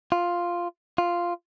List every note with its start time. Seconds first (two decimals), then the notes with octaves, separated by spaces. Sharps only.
0.12 F4
0.98 F4